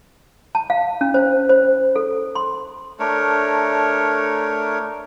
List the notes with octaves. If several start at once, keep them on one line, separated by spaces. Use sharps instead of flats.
A5
F5
C#4
C5
C5
A4
C6
A3 D4 A#4 C#5